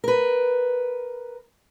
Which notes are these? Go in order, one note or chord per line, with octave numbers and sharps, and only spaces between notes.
A#4 B4